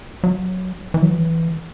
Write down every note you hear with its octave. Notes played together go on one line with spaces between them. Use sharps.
F#3
E3
F#3
E3